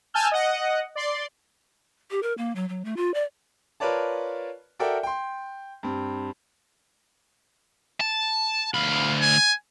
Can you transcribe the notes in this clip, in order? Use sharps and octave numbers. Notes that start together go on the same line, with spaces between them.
G#5 A5 E6 F6 G6
D#5 F#5
D5 C6
G4
A#4
A#3
F#3
F#3
A3
F4
D5
F4 A#4 B4 C#5 D5 A5
F#4 A4 A#4 D5 E5 G5
G5 C6
G2 C4
A5
D2 F5 B5
G#5